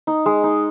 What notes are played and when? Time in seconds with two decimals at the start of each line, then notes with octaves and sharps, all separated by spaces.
0.07 D#4
0.26 G#3
0.44 D#4